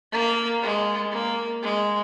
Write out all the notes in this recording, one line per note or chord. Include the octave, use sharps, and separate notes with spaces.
A#3
G#3
A#3
G#3